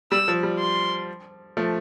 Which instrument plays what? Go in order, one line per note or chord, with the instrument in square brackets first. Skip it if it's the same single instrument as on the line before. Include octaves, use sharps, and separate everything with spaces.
[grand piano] G3 [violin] E6
[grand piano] F3
G3
[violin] C6
[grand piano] F3 A3